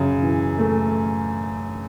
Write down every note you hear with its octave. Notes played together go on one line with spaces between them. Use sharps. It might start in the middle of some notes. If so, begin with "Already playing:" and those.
Already playing: F#2 C#3
E3
A3